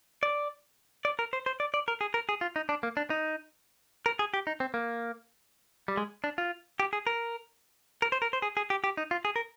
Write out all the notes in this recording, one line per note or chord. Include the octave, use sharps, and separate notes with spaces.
D5
D5
A#4
C5
C5
D5
D5
A#4
G#4
A#4
G#4
F4
D#4
D4
A#3
D4
D#4
A#4
G#4
G4
D#4
C4
A#3
G3
G#3
D4
F4
G4
G#4
A#4
A#4
C5
A#4
C5
G#4
G#4
G4
G4
D#4
F4
G#4
A#4